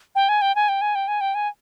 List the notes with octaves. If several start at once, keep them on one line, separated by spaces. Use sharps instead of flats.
G5
G#5
G5
G#5
G5
G#5
G5
G#5
G5
G#5